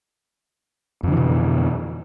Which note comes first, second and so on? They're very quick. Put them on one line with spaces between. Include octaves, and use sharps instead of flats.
F2 D3 E3 B2